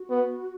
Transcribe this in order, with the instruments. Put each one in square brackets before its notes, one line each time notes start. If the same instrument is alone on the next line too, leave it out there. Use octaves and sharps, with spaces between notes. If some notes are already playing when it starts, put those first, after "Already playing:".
Already playing: [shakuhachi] F#4
[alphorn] B3